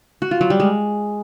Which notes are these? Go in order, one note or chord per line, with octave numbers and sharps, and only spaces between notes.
F#4
F4
F#3
G3
G#3